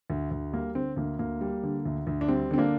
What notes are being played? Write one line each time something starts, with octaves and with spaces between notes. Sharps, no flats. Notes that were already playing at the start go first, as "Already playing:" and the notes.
D2
D2
G3 A#3
D3 C4
D2 A#3
D2 A#3
G3
D3
D2
D2
D4
G3 C4
D3 C4
A#3 D4